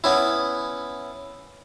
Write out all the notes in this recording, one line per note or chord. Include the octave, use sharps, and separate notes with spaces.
B3 C#4 E4